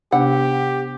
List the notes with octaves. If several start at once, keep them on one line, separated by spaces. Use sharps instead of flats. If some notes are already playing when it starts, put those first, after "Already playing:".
C3 B3 D4 G4 F#5